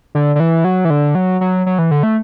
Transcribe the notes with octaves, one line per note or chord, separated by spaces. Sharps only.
D3
D3
E3
F#3
E3
D3
F#3
F#3
F#3
E3
D3
A3